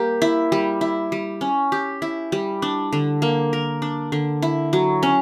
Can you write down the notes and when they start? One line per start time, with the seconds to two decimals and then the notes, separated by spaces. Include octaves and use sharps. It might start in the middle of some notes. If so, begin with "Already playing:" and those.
Already playing: G3 A#3 G4
0.22 E4
0.52 G3
0.81 E4
1.12 G3
1.41 C#4
1.72 G4
2.02 E4
2.32 G3
2.62 D4
2.93 D3
3.22 A#3
3.53 A#4
3.82 D4
4.12 D3
4.42 E4
4.73 F#3
5.03 C#4